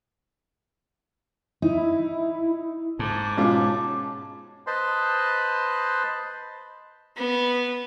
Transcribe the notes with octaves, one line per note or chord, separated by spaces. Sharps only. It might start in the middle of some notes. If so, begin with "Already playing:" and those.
D#4 E4
G#2 A5 D6
B2 G#3 C#4 F4
B4 C5 D#5 A5 B5 C6
B3